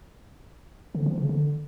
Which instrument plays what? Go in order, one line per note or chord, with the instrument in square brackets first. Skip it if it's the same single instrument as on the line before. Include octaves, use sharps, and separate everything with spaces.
[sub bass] D3
F3
C#3
D3